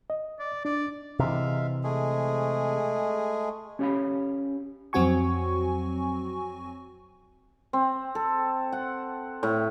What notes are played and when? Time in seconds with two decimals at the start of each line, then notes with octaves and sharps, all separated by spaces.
0.10 D#5
0.39 D5
0.65 D4 D5
1.19 C3 E3 G#3 E5 F5
1.84 G#3 A3 G#4
3.79 C#4 G4 C#5 F5 B5
4.93 F2 F#3 C4 F#4 G#5 C#6
7.73 C4
8.15 A4
8.72 F#5
9.43 A2